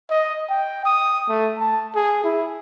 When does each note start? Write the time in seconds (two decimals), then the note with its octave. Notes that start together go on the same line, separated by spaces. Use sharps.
0.10 D#5
0.49 G5
0.85 D#6
1.28 A3
1.58 A5
1.95 G#4
2.24 E4